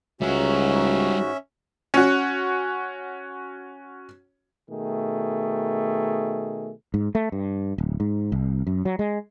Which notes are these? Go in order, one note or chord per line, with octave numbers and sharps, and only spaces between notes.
C#2 G#2 G3 C#4 F#4 E5 A#5
C#4 F#4
B2 D#3 A3 G#4
G#2
A3
G2
D1
G#2
C2
F#2
F#3
G#3